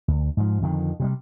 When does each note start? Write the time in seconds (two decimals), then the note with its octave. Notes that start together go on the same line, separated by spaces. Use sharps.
0.08 D2
0.37 G#2 F3
0.62 F2 D3 D#3
1.00 C3 F#3 G3